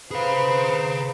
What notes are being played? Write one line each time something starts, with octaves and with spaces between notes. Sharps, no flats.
G#4 B4 C5 F5 A#5